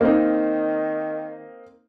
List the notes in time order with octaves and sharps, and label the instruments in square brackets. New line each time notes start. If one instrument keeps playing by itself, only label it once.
[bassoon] D#3 [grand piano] A#3 C4 D#4